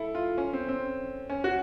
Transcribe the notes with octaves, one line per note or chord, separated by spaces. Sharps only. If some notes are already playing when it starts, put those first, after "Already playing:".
Already playing: E4 A4
F4
C#4
C4
C4
C#4
F#4